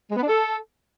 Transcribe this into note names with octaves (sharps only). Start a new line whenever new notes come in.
G#3
B3
D4
A4